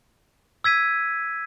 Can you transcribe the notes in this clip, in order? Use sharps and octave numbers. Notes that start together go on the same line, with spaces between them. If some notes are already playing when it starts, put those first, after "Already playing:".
E6 G#6 B6 D#7